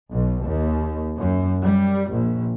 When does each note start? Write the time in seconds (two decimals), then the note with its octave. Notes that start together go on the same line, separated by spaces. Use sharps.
0.11 B1
0.44 D#2
1.18 F#2
1.64 G3
2.12 A#1